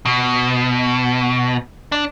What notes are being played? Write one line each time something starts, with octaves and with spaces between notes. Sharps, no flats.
B2
D4